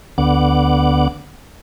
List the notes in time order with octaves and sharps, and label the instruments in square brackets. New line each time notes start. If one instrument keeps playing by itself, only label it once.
[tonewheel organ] D2 D3 B3 F#5 D6